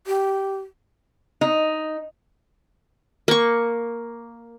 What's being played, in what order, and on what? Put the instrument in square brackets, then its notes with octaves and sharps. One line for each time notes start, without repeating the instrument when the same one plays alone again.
[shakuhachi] G4
[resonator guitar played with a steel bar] D#4
[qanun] A#3 C#6